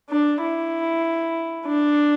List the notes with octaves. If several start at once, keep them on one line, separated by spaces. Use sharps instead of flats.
D4
E4
D4